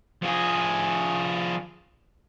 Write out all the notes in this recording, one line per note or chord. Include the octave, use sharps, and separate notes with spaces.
F3 G#4